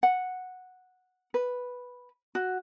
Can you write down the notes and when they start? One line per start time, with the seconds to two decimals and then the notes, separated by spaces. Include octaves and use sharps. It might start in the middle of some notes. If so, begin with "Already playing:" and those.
0.03 F#5
1.34 B4
2.35 F#4